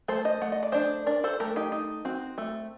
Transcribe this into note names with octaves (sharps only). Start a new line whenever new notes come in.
A3 A4 C5
C5 D#5
A3 F#5
D#5
D5
D4 C5 D#5
D4 A#4 D5
A4 C5
A3 G4 A#4
D#4 G4
D#4
C4 F#4
A3